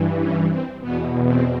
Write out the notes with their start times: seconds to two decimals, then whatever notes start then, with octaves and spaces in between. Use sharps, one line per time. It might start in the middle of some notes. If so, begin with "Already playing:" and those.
Already playing: G2 E3
0.21 C#4
0.51 C4
0.81 E2 B2 B3
1.26 C4